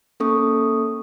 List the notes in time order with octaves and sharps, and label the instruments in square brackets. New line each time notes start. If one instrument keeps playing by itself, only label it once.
[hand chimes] A#3 C#4 A4 C#6 D#6